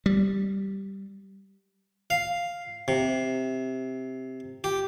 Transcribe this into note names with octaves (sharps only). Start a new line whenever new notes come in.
G3
F5
C3
G4